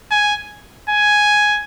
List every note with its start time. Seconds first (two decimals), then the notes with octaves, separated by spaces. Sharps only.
0.11 G#5
0.90 G#5